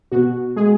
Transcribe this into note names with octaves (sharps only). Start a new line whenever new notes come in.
B2 F#4
G#3 G#4